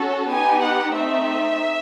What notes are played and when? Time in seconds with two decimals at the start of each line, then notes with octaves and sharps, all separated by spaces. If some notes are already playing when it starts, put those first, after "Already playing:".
Already playing: C#4 F#4 A4
0.29 B3 D#4 G4 G#5
0.61 F#5
0.94 A3 C4 D#4 E5